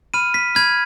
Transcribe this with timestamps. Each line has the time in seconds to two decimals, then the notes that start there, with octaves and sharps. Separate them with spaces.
0.14 B5 F6 D#7
0.34 B6
0.55 B5 F6 G#6